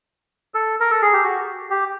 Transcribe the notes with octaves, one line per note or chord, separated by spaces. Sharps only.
A4
A#4
A4
G#4
G4
F#4
G4